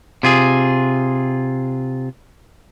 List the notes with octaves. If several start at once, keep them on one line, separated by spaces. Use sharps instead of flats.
C3 F4 G#4